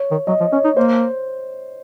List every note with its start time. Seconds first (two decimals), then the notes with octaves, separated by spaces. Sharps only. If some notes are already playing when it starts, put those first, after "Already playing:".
Already playing: C#5
0.11 D#3
0.27 F#3 D#5
0.40 F3
0.52 C#4 C#5
0.64 D#4
0.76 A#3 C5